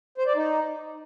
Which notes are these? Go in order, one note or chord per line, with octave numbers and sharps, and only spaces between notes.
C5
D5
D#4